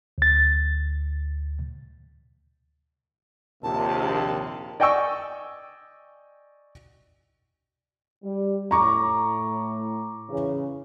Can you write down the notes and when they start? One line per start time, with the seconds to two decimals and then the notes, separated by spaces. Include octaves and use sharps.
0.18 D2 A6
3.64 A#1 D#2 C3 A5
4.80 D5 D#5 G5 G#5 C#6 E6
8.24 G3
8.71 A2 A#5 C#6 D6
10.29 C#3 E3 C#4